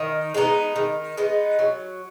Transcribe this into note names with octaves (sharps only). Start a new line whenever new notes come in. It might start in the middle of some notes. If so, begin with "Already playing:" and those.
Already playing: D#3
G#3 B3 D#4
D#3
G#3 B3 D#4
F#3